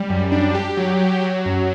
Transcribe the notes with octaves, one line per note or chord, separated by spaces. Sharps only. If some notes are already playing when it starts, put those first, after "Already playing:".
Already playing: G3
F#2
D4
G4
F#3
F#3
F#3
F#2